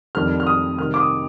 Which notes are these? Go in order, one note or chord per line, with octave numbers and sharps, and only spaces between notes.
F2 D#3 G3 D4 F6
F6
D#6
C3 D#3 G3 F6
D6
D#6